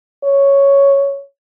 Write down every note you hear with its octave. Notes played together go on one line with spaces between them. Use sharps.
C#5